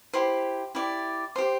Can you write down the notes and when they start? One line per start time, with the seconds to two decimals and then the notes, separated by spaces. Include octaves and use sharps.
0.13 E4 G4 C5 C6
0.75 E4 G4 D5
1.36 G4 C5 C6